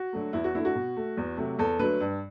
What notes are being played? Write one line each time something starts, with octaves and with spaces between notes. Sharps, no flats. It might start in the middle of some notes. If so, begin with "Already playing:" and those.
Already playing: F#4
D3 F#3 A3
E2 E4
F#4
D3 A3 E4
F#4
B2
A3
E2
C3 F#3 A3
E2 A4
D3 F#3 A3 B4
G2